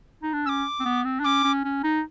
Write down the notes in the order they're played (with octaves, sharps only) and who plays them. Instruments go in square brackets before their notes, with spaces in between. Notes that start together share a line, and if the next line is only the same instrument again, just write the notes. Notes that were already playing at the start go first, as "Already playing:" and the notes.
[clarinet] D#4
D4
[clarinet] C#4 [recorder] D6 E6
[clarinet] C4
B3
C4
D4
[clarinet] C#4 [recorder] D6
[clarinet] C#4
C#4
D#4